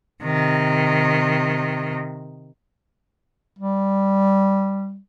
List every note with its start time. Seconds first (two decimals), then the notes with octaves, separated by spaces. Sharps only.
0.23 C3 D#3
3.59 G3